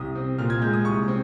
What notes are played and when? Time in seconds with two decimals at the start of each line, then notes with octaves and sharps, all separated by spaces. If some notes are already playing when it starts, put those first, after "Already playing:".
Already playing: C2 D#6
0.15 C4
0.38 A#2 F6
0.50 G#6
0.62 G#3 G6
0.73 D#6
0.85 C2 C#6
1.08 C4